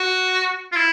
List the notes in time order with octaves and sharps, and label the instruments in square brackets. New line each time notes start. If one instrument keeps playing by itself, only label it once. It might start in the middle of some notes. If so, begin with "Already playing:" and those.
Already playing: [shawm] F#4
F4
E4